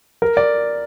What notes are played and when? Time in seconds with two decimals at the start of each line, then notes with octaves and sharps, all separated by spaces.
0.22 A#4
0.37 D5